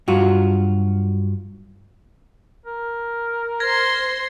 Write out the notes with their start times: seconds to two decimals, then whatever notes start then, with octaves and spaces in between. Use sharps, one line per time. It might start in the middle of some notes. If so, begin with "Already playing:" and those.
0.08 G2 F#3 F4 F#4
2.66 A#4
3.60 C5 C6 G#6 A#6